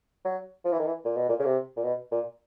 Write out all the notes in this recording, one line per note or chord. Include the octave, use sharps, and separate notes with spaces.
F#3
F3
E3
D#3
E3
A#2
B2
A#2
C#3
C3
A#2
B2
A#2